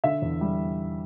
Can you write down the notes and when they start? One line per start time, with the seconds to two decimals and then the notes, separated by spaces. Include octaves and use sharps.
0.04 D3 E5
0.22 E2
0.41 G3